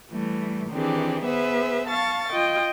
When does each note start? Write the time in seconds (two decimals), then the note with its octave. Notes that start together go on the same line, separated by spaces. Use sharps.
0.12 E3 G3 A3
0.70 D#3 E3 C4 D4 G4 G#4
1.25 B3 G#4 B4 C5 E5
1.88 F5 A5 C#6 A6
2.32 F4 D#5 G5